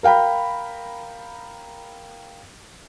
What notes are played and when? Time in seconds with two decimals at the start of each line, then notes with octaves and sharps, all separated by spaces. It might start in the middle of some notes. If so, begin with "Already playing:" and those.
0.03 A#4 F5 G5 A#5 B5